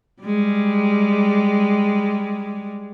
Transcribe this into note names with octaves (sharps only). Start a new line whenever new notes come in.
G3 G#3